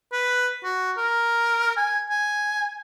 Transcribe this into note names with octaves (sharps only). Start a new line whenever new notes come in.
B4
F#4
A#4
G#5
G#5